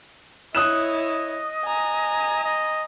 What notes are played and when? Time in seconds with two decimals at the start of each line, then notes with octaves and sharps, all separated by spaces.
0.55 E4 C#5 D#5 D#6 F#6 E7
1.65 G#5 A#5
2.44 D#5